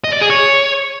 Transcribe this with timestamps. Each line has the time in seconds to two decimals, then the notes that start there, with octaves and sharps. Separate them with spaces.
0.04 D#5
0.13 D5
0.21 G#4
0.30 C#5